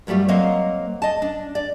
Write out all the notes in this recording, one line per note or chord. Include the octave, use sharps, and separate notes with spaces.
F#2 F#3 G3 A3 F4
F#3 A#3 C4 D#5 F5
D#5 A5
D4
D5